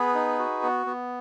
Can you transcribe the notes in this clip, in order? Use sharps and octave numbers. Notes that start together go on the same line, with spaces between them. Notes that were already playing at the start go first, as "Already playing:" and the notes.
Already playing: B3 G#4 B4
D#4
F#4
B3
B3